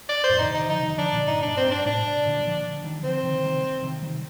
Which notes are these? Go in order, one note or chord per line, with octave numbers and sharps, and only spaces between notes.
D5
C5
F2 A2
D3 D#4
C3 D#3
D#4
D#3
D3 F3 D#4
D#3 G3
D3 F3 D4
A#2 D3
G2 A#2 D#4
G2 D4
C4
G2 D4
A2 C3 D4
A#2 D3
G3
D3 F3
D#3 G3
D#3
D3 F3 C4
C3 D#3
D#3 G3
C3 D#3
D#3 G3